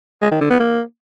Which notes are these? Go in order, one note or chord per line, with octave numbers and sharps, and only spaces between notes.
G#3
D#3
D3
B3
A#3